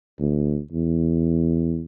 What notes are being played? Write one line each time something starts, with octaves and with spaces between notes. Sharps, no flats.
D2
E2